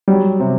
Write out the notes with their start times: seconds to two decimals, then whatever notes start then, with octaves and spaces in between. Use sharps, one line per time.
0.08 F#3 G3
0.40 C3